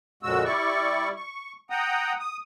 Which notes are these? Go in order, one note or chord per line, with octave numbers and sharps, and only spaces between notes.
F2 A#2 C#3 G#3 F#4 E6
G3 E4 D5 C#6
C#6
F#5 G5 A#5 D#6
D#6